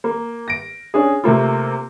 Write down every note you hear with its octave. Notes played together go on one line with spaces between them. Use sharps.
A#3
A#6 D7
C#4 D4 G#4
C3 A3 A#3 F4